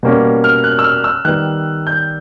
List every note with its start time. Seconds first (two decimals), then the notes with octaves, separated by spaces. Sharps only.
0.03 B2 G3 A#3 C#4
0.44 F6
0.64 F#6
0.79 E6
0.84 F6
1.04 E6
1.25 D#3 G3 B3 F#6
1.87 G6